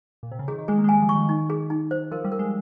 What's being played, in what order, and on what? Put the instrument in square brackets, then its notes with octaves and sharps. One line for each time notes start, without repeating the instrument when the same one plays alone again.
[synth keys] A#2
C3
C#3
[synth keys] D#3 [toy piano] G#4
[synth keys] D#3
[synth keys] G#3 [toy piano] G#4
[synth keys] A#3
G#3
[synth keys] G3 [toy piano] G#5
[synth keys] F3
[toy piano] C#6
[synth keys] D#3
[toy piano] D#4
G#4
D#4
C5
[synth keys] F3 [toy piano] A#4
[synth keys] G3
[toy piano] A#4
[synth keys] G#3